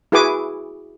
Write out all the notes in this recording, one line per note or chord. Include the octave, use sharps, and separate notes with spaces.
E4 F#4 G#4 B4 G#5 D6